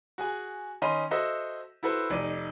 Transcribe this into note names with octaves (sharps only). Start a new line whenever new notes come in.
F#4 G#4 G#5
D#3 C#4 D#5 B5 C6 D#7
F#4 A4 C5 D#5 E5 F#5
E4 F#4 A4 B4 C5
F1 D#4 D5 D#7